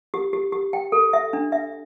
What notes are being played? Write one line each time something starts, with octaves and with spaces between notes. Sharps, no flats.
G4
G4
G4
G5
A4
E5
D4
E5